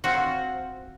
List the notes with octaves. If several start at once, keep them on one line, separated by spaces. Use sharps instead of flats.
C4 F4 F#4